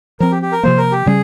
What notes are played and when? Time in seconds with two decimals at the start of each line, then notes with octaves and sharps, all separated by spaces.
0.20 F3 C4 A#4
0.31 G4
0.42 G4
0.52 A#4
0.63 C3 F3 A#3 C5
0.78 A#4
0.92 G4
1.06 C#3 G3 C#4 G#4